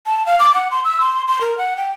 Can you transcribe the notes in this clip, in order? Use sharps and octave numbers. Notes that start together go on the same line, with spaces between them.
A5
F5
D6
F#5
C6
E6
C6
C6
A#4
F#5
G5